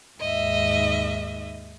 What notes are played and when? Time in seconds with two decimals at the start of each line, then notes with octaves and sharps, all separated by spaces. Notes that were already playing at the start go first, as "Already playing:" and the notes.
0.20 D#2 G#2 D#5 E5